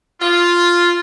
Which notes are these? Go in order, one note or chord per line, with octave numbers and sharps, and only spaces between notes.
F4